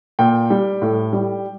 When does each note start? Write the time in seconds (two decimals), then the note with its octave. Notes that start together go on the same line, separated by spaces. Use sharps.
0.19 A#2 G5
0.50 G3
0.82 A2
1.13 G3